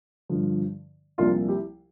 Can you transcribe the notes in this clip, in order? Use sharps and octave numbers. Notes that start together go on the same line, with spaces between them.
G2 D3 F3
C2 A#2 F3 D4 F4
E4 G4